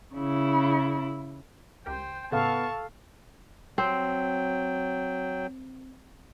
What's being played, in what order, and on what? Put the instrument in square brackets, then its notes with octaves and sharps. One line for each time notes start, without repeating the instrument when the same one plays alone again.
[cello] C#3 E4
[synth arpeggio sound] C#2 G4 A#4 [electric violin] C5 G5
[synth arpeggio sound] A2 C#3 [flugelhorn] B3 [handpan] A4 F5 [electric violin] A5 C#6
[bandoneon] F#3 G5 [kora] C4